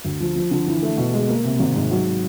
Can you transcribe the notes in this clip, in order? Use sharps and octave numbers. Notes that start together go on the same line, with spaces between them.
D2
F3
F3
D3
E3
A3
B2
G#3
A#3
C3
G#1
G#2
F#3